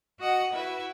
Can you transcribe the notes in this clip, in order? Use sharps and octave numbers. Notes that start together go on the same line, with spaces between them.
F#4 D#5 F#5
E4 F#4 B4 E5